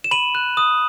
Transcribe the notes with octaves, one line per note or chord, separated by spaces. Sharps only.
E7
B5 D#7 F#7
F#6
D#6